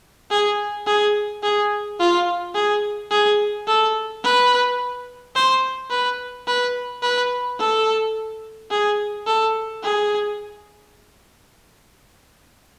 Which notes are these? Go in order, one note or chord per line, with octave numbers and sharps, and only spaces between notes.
G#4
G#4
G#4
F4
G#4
G#4
A4
B4
C5
B4
B4
B4
A4
G#4
A4
G#4